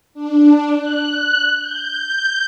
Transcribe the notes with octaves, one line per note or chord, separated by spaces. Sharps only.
D4
F#6
G6